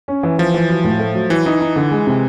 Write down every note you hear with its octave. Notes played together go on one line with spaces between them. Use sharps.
C#4
E3
E3 F3
E3
F#3
A2
A3
F#3
E3 F#3
E3 D#4
D#4
D3
G#3
C3